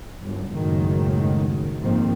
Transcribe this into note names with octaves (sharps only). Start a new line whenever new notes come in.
G1 F#2
F#1 A2 D#3 F#3 G#3
G#2 D#3 F3 A#3 C4